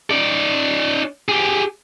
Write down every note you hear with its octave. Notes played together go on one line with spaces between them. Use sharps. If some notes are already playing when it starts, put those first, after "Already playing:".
D#4 D5
G4 G#4